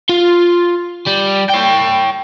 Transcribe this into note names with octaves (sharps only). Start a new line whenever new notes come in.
F4
G3
C#5 G5